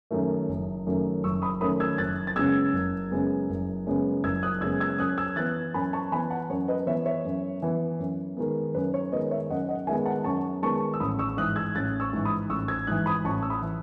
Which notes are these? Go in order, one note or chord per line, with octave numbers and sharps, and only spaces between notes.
F#2 D#3 F#3 A3
F#1
F#2 D#3 F#3 A3
F#1 C#6 E6
B5 D#6
F#2 D#3 F#3 A3 B5 D#6
E6 G#6
F#1 F#6 A6
A6
F#2 C#3 G#3 B3 E6 G#6
F#1
F#2 C#3 G#3 B3
F#1
F#2 C#3 G#3 B3
F#1 E6 G#6
D#6 F#6
F#2 C#3 G#3 B3 E6 G#6
E6 G#6
F#2 D#6 F#6
E6 G#6
E3 B3 F#6 A6
F#2 G#5 B5
A5 C#6
E3 B3 G#5 B5
F#5 A5
F#2 C#5
B4 D#5
E3 B3 C#5 E5
C#5 E5
F#2
E3 B3
F#2
D#3 G#3 B3
F#2 B4
C#5
D#3 G#3 B3 B4 D#5
C#5 E5
F#2 D#5 F#5
D#5 F#5
D#3 G#3 B3 E5 G#5
F#5 A5
F#2 A5 C#6
D#3 G#3 B3 A5 C#6
E6
A1 B5 D#6
C#6 E6
G#2 E3 D#6 F#6
E6 G#6
A1 F#6 A6
C#6 E6
G#2 E3
B5 D#6
A1 C#6 E6
E6 G#6
G#2 E3 D#6 F#6
B5 D#6
A1 A5 C#6
E6
B5 D#6
E3